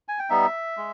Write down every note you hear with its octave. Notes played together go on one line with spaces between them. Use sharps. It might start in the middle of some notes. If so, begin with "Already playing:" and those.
G#5
G5
G3 B3 D#4 E5
G#3